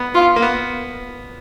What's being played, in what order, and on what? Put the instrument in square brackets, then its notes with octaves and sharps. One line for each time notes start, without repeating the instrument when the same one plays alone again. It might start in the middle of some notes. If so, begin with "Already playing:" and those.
Already playing: [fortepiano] B3
[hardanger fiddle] F4
[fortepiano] A#3
B3